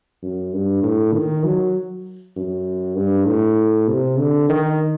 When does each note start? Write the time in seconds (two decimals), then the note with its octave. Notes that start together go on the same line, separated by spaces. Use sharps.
0.23 F#2
0.53 G2
0.83 A2
1.14 D#3
1.44 F#3
2.36 F#2
2.96 G2
3.26 A2
3.88 C3
4.19 D3
4.49 D#3